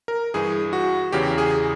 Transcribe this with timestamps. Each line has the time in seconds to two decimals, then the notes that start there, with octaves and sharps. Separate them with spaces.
0.08 A#4
0.34 G2 E3 G#4
0.73 F#4
1.12 E2 C#3 E3 G4
1.38 G#4